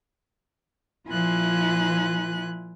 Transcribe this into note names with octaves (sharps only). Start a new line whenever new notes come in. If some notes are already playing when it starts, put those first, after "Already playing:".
A#2 F3 E4 F4 G#5 F#6